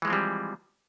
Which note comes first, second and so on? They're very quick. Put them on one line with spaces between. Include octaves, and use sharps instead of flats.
E3 G#3 F3 C4 G3